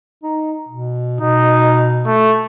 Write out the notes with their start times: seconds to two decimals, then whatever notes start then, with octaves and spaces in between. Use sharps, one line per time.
0.23 D#4
0.69 B2
1.21 B2 D#4
2.06 A3